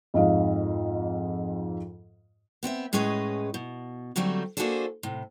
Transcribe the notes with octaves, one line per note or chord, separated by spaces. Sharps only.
F2 G#2 D#5 F5
B3 C4 D#5 E5
A2 G#3 C#4 G#4 B4 D#5
B2
D3 F#3 G3 A3 C4
A#3 D4 F#4 G#4 A4 C5
A2 C3